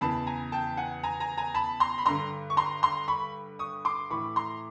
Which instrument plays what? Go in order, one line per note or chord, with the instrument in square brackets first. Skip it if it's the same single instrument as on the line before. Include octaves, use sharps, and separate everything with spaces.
[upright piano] E2 C#3 E3 A5 B5
G#5 A#5
G5 A5
F#5 G#5
G#5 A#5
G#5 A#5
G#5 A#5
A5 B5
A#5 C6
B5
G2 D3 A#5 C6
C#6
A#5 C6
A#5 C6
B5 C#6
C#6 D#6
C6 D6
A2 E3 B5 C#6
A#5 C6